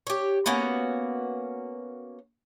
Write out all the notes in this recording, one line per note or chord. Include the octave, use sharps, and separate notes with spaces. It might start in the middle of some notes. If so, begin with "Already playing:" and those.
G4 C#5
A#3 B3 C#4 F#4